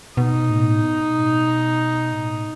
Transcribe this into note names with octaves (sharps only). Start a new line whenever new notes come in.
B2 D#4
A2
B2
A2